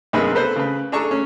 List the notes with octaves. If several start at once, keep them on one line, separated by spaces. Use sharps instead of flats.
B1 G2 C3 A#3 G#4 B4
B3 A4 B4 C5
C#3 B4
D4 G#4 A4 A#5 C#6
C#4